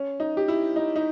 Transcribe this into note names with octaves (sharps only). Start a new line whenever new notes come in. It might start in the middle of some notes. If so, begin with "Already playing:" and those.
Already playing: C#4
D#4
G4
E4
D#4
D#4